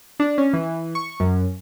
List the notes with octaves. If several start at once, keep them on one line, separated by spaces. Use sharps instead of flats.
D4
C#4
E3
C#6
F#2